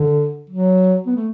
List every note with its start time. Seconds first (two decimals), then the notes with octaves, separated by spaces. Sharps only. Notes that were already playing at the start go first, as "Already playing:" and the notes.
Already playing: D3
0.50 F#3
1.07 B3
1.16 A3